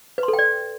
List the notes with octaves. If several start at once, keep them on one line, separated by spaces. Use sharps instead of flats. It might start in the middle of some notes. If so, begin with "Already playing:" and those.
B4
C6
A4
G5
D5